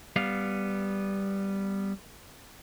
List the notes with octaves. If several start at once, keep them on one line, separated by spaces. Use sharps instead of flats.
G3 B3 F5